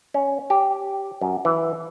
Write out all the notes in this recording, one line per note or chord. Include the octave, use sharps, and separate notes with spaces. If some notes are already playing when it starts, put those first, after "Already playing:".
C#4
G4
F#2
E3